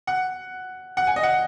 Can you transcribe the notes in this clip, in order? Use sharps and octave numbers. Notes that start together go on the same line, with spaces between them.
F#5
F#5
G#5
D#5
F#5